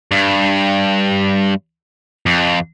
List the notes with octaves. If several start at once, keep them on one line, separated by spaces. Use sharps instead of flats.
G2
F2